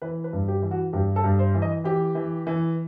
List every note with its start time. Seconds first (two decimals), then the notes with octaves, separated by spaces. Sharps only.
0.02 E3 B4
0.24 B4
0.33 G2
0.48 G4
0.62 E3
0.71 F#4
0.93 G2 G4
1.16 A4
1.24 G2
1.39 C5
1.55 E3
1.62 D#5
1.84 E3 G4
2.15 E3
2.47 E3